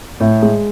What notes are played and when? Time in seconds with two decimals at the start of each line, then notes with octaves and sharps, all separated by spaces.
0.20 A2
0.42 G#3